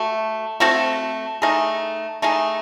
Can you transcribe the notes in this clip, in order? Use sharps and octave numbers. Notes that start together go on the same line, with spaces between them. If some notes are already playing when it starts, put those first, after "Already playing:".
Already playing: A3 F#4
A3 C4 F#4 A4
A3 D#4 G#4
A3 D#4 G#4